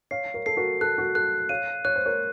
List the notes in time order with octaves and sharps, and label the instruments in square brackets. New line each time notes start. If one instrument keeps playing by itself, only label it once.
[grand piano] C#5 F5 [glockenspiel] C7
[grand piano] A#4 C#5
[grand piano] A4 [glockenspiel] C7
[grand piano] F#4 A#4
[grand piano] A4 [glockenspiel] F#6
[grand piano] F#4
[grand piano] A4 [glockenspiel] F#6
[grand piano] C#5 F5 [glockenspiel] D#7
[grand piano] C#5 [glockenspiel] F#6
[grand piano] C5
A#4 C#5